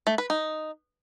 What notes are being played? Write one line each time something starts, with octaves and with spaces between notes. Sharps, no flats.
A3
B4
D#4